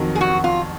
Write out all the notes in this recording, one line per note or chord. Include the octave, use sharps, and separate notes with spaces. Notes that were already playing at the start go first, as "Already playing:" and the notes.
Already playing: F2 D#3 F#3
G#4
F#4
F4